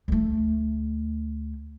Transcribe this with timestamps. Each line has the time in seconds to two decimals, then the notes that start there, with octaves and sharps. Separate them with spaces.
0.08 D2 A3